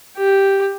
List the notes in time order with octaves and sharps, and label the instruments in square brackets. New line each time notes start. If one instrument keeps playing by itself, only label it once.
[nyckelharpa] G4